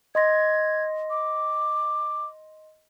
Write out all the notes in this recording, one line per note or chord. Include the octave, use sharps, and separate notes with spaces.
D#5 C6 G#6 A#6
D6